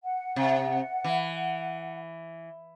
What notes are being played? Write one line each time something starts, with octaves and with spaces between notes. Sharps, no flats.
F#5
C3
E3